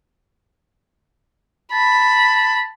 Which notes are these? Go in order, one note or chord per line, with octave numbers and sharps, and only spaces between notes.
A5 B5